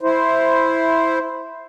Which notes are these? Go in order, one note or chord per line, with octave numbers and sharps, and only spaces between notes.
E4 C5